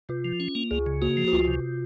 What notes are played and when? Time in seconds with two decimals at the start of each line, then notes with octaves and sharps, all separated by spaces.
0.09 C3 F4
0.25 F3
0.40 C#4
0.55 A#3
0.71 C#2 G#4
0.86 C#3
1.02 A#3 F#4
1.17 F3
1.28 F#4
1.33 C#2 F4
1.48 C3